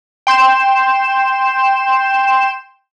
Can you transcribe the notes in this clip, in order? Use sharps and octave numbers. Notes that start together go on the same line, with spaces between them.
G5 C6 G6 E7